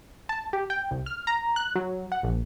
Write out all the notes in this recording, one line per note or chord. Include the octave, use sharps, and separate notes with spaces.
A5
G4
G5
C2
F6
A#5
F#6
F#3
F#5
A#1